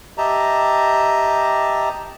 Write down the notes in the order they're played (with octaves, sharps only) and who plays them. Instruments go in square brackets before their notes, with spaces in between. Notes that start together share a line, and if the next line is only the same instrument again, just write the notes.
[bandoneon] G4 D#5 E5 A5 A#5